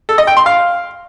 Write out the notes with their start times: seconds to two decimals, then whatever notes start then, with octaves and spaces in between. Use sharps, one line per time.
0.09 A4
0.18 D#5
0.27 G5
0.37 C6
0.46 F5